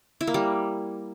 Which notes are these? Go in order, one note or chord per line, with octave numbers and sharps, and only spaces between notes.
E4
A#3
G3